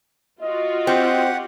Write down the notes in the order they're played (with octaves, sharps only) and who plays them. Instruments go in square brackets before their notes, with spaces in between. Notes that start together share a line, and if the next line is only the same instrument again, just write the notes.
[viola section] F4 F#4 [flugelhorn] D#5
[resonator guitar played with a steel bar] C4 [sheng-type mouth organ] G4 F#5